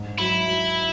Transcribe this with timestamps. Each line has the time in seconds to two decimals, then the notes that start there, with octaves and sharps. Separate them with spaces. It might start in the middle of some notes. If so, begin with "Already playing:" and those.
Already playing: G#2
0.18 F#3 E4
0.47 F#3